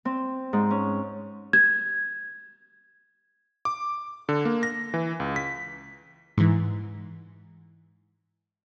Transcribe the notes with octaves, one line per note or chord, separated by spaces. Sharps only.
C4
G#2
C#4
G#6
D6
D3
A#3
A#6
E3
C#2
B6
G#2 E3